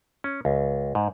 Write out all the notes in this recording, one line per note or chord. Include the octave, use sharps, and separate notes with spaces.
C#4
C#2
G#2